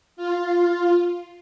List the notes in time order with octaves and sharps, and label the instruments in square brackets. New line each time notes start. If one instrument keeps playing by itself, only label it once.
[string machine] F4